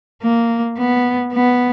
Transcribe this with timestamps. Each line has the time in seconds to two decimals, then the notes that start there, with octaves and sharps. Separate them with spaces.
0.22 A#3
0.78 B3
1.33 B3